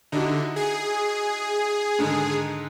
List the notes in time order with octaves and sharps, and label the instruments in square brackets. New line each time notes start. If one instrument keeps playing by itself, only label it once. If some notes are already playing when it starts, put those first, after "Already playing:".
[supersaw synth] D3 [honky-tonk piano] D#4 E4 F#4
[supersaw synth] G#4
[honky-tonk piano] G#2 D3 D#3